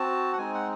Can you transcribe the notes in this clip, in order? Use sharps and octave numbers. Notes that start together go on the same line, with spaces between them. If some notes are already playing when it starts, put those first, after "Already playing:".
Already playing: C4 F#4 A5
F#5
G#3 C4 D#4 G#5
F#5